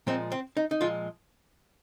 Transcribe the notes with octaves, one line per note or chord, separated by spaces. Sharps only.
A#2 F3 G#3 C4
C4
D#4
D#4
A#2 F3 G#3 F4